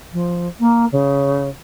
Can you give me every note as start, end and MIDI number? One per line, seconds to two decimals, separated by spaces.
0.12 0.47 53
0.59 0.85 58
0.91 1.48 49